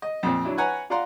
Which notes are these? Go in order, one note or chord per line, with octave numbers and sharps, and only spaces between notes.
D#5
F2 A#2 C4
F#3 D4 E4
B4 C#5 F#5 G#5 A#5
F4 D5 F5 F#5 A#5 C6